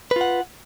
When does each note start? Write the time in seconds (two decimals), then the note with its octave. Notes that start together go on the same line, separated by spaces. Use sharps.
0.11 B4
0.16 F4
0.21 F#5